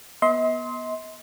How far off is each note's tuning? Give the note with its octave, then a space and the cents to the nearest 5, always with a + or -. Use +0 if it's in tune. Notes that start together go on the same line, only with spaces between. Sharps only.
B3 -20 D#5 +45 C6 +0